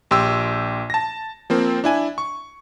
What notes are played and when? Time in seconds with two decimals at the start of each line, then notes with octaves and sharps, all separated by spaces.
0.11 A#1 G4 G5 C6 E6
0.90 A5 A#6
1.50 F3 A#3 C4
1.84 D4 E4 G#5
2.18 C#6